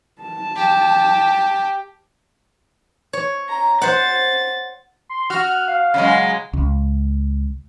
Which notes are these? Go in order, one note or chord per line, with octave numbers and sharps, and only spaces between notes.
A5
G4
C#5
A#5
C5 F#5 A6
C6
F#4 F6
F5
C#3 F#3 G#3
C#2